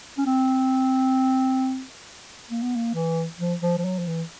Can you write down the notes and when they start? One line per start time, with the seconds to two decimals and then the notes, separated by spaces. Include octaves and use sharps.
0.18 C#4
0.26 C4
2.51 A#3
2.63 B3
2.76 A#3
2.94 E3
3.39 F3
3.62 F3
3.78 F3
3.85 F#3
3.99 F3
4.07 E3